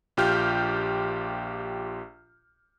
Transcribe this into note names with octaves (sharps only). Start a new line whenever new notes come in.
A#1 F4 G4 F6 G6